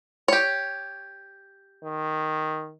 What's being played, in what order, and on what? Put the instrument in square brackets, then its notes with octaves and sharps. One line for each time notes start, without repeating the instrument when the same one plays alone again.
[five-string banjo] G4 C#5
[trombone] D#3